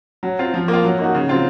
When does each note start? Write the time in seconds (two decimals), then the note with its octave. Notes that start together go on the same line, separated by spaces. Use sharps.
0.23 F#3
0.39 C4 F4
0.54 F3
0.68 A#3
0.73 F4
0.84 F#3
0.99 A#3 D#4 F#4
1.15 C#3
1.29 F#3 C4 F4